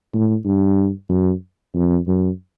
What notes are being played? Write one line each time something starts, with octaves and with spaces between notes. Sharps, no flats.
A2
G2
F#2
F2
F#2